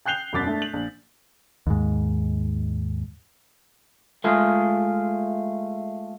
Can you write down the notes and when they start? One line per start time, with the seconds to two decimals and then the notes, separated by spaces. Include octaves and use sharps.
0.05 G5 F#6 G6 C7 F7 G7
0.33 E1 F#2 D6 A6 B6
0.46 A3 D4
0.62 F#7
0.73 A#1
1.67 D#2 G#2
4.24 G#3 A3 F4 G#4